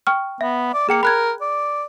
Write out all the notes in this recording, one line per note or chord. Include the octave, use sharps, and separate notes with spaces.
G5 C#6 F6
B3 E5
D5
A#3 G#4 G5 C#7
A#4 B5 F#6 G#6
D5